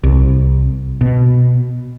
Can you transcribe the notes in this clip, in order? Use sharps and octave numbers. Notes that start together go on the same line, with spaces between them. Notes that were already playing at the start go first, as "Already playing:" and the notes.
C2
B2